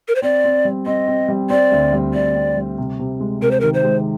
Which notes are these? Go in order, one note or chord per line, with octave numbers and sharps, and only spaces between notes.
A#4
C5
C4 D5
C4
G3
C4 D#5
C4
G3
C4 D5
D2
G3
D2 D5
C4
G3
C3
C3
G#3
C3 A#4
C5
D#3 A#4
C5
G#3